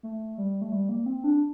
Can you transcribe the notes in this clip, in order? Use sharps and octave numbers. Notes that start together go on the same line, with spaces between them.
A3
G3
A3
G3
A#3
C4
D4